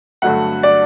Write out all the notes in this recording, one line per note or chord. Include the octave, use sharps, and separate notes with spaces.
G2 D3 F#3 A3 F#5
D5